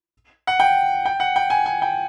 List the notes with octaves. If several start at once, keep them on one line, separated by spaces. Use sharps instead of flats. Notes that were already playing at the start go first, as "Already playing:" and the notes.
F#5
G5
G5
F#5
G5
G#5
G#5
G5